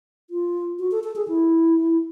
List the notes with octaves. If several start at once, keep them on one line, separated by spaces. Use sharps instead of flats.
F4
F#4
A4
A4
G#4
E4